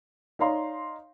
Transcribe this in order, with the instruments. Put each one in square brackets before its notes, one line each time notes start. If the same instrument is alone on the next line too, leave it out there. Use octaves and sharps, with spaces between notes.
[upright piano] D#4 C#5 D5 F5 A#5 C6